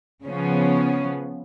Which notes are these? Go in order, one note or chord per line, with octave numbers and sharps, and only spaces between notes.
C#3 F3 B3 C#4